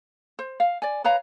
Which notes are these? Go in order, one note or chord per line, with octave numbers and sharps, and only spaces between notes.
C5
F5
D5 G#5
B4 C#5 F5 A#5